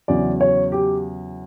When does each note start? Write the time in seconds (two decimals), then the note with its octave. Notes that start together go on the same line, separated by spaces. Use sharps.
0.08 E2 C#3 F#3 D5
0.41 C#5
0.72 G4